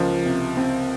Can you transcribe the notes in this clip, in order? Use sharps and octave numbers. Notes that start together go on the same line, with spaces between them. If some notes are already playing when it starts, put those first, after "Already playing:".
Already playing: C#2 F3 A#3
C3
C4